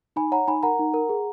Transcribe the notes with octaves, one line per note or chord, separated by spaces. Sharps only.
D#4 G#5 B5
C#5 F#5 A#5
D#4 G#5 B5
A#4 F#5 A#5
D#4
A#4
G#4